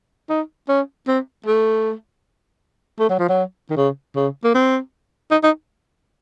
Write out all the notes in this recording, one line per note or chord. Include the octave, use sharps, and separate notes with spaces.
D#4
C#4
C4
A3
A3
F#3
F3
F#3
D#3
C#3
C#3
A#3
C4
D#4
D#4